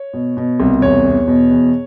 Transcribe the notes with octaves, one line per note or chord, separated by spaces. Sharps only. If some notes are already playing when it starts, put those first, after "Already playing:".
Already playing: C#5
B2
B2
C2
E2 C#5
E2
B2
E2